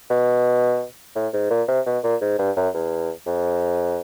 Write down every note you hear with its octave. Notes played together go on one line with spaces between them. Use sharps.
B2
A2
G#2
A#2
C3
B2
A#2
G#2
G2
F#2
E2
F2